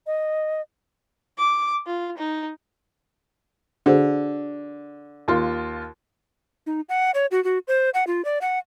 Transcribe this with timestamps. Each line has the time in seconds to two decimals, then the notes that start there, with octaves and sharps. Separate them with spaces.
0.07 D#5
1.38 D6
1.86 F4
2.18 D#4
3.86 D3 F#4 G#4 C5
5.28 D#2 F4
6.67 D#4
6.89 F#5
7.14 C#5
7.31 F#4
7.44 F#4
7.68 C5
7.94 F#5
8.07 F4
8.25 D5
8.42 F#5